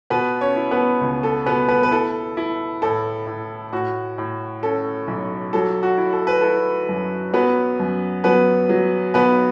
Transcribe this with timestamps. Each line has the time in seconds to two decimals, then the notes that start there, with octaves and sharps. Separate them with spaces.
0.10 B2 B3 B4
0.41 C#4 C#5
0.56 E4
0.71 B3 B4
1.01 C#2
1.23 A4
1.46 B2 B3 B4
1.68 B3 B4
1.83 B4
1.91 E4 A4
2.37 E4
2.82 A2 A4
3.27 A2
3.72 A2 F#4
4.18 A2
4.63 C#4 A4
5.08 B1
5.53 F#3 A4
5.83 F#4
5.98 E4
6.13 A4
6.27 B4
6.41 E4 A4
6.89 F#2
7.33 F#3 B3 B4
7.79 F#2
8.24 F#3 B3 B4
8.69 F#3
9.14 B1 B3 B4